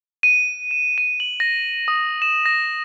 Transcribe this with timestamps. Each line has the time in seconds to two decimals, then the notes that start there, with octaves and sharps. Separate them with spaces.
0.23 D#7
0.71 E7
0.98 D#7
1.20 F#7
1.40 A#6
1.88 D#6
2.22 E7
2.46 A#6